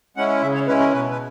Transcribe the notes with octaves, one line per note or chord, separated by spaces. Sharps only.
G#3 C#4 E4 F#5
C#3 E5
C#5
G#3 C#4 E4 B4
A#4
B2 B4
B4